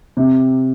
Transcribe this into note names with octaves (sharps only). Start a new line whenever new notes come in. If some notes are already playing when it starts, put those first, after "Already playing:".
C3